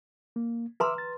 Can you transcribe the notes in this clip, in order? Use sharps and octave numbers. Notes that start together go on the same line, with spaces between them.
A#3
B4 E5 A#5 C6 D6 E6
A6